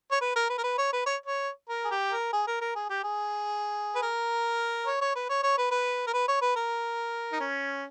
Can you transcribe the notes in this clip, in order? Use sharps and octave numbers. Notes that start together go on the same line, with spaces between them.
C#5
B4
A#4
B4
A#4
B4
C#5
B4
C#5
C#5
A#4
G#4
G4
A#4
G#4
A#4
A#4
G#4
G4
G#4
B4
A#4
C#5
C#5
B4
C#5
C#5
B4
B4
A#4
B4
C#5
B4
A#4
D#4
C#4